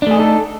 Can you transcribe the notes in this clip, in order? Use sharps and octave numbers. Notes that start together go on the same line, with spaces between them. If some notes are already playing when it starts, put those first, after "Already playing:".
A3 D4 D#4 G#4 A4